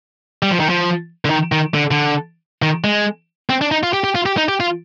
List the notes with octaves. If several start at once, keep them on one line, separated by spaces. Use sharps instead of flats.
G3
F3
D#3
F3
D3
D#3
D#3
D3
D3
D#3
G#3
C4
D4
D#4
F4
G4
G4
F4
G4
D#4
G4
F4